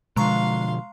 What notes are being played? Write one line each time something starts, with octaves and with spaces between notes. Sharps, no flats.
B2 D3 F3 G#3 F5 A#5 C6 C#6